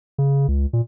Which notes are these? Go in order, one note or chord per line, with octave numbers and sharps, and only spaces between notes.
C#3
C#2
A#2